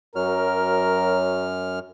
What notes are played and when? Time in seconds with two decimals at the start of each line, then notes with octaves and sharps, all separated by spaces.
0.16 F#2 F#3 A#4 F6